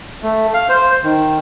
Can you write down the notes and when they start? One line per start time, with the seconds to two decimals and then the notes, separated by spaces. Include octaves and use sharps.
0.23 A3
0.54 F5
0.69 C5
1.04 D#3